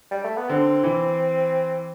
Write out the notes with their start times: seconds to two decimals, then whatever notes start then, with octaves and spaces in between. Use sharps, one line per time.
0.11 G3
0.24 A3
0.37 B3
0.49 D3 C4
0.84 E3